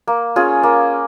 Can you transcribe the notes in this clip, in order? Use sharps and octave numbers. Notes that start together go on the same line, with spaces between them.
A#3
C#4 F4 G#4
A#3